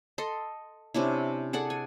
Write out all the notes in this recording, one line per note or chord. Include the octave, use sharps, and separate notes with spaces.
A4 D#5 C6
C3 C#4 D4 E4
G#4 A4 D5 F#5
G#5